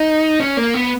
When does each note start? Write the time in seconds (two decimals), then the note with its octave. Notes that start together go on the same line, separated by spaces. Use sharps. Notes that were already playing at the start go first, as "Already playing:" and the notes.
Already playing: D#4
0.40 C#4
0.57 A#3
0.74 B3